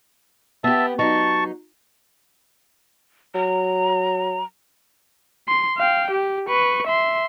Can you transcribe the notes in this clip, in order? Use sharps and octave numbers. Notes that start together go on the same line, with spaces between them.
B3 G4 E5 A5
F#3 D#4 A5 C#6
F#3 A#5
C6
F5 G5
G4
B4 C#6
E5 C6